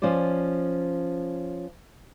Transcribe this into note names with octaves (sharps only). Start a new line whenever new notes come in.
F3 C#4 F4 C5 D5